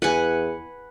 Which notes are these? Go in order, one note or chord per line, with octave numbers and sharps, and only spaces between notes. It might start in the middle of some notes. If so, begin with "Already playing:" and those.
E2 B4 F#5 G#5